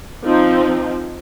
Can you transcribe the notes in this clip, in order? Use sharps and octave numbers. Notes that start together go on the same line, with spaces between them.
F3 C4 D#4